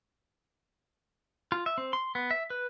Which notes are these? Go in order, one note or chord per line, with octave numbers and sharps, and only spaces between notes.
F4
E5
C4
C6
B3
E5
B4